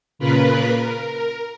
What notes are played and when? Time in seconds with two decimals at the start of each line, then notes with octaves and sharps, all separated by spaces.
0.19 A#2 C#3 F4 A#4 B4 B5
0.79 A#4